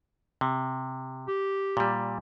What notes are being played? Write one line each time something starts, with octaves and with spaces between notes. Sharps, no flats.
C3
G4
A#2 G3